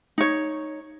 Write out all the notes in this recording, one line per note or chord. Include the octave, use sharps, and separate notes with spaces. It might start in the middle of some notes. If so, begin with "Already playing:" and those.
D#4 C#5